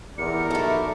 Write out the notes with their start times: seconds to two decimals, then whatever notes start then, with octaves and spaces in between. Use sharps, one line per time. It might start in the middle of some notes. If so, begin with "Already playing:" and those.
0.18 E2 G4 A#4 D5 C#7
0.51 B1 A3 E4 A5